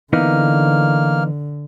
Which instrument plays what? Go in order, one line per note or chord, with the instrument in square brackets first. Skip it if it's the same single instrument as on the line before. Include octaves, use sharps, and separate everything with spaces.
[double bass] D3 [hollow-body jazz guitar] E3 B3 D#4 [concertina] A#3 F6